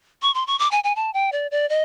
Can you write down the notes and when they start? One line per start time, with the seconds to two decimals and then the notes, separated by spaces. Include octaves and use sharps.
0.22 C#6
0.35 C6
0.47 C#6
0.59 D6
0.71 G#5
0.84 G#5
0.96 A5
1.14 G5
1.32 D5
1.51 D5
1.70 D#5